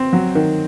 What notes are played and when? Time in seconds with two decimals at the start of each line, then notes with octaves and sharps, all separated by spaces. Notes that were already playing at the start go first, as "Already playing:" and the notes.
Already playing: C4
0.13 F#3
0.35 D#3